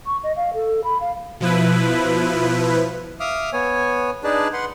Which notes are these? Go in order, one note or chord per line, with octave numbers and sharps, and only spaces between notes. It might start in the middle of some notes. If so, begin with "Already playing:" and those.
C#6
D#5
F5
A4
B5
F5
B2 F3 E4 B4
E5 F5 D6 D#6 F6
B3 C#5 G#5
D4 D#4 G#4 B4 D5 A5
B4 F#5 C6